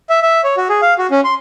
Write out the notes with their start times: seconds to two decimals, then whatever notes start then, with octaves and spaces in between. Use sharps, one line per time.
0.09 E5
0.22 E5
0.44 C#5
0.57 F#4
0.69 G#4
0.82 F5
0.98 F#4
1.11 C#4
1.24 C6